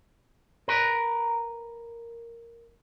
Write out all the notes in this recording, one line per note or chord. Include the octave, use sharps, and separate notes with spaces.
A#4 B4